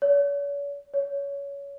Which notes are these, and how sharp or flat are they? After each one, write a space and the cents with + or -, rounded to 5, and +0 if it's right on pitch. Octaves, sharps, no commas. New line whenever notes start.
C#5 +45
C#5 +20